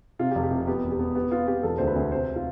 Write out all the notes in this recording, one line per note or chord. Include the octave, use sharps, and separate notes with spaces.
C3 F4
G4
F1
G4
C3
B3 G4
E1
G4
B3
B3 G4
B3 F4
B3 G4
E1 A4
D2 C5
B4
D2
C3 C5
F4